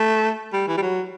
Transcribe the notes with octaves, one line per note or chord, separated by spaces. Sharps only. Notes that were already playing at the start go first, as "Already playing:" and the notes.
Already playing: A3
G3
E3
G3
F#3